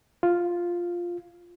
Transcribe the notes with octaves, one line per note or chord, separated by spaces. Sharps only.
F4